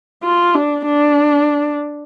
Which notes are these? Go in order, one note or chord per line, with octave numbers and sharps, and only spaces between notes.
F4
D4
D4